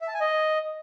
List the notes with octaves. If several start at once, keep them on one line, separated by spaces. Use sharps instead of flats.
E5
A5
G#5
D#5